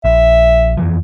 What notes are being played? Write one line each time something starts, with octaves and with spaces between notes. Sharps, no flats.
A#1 E5
F2 E3 F3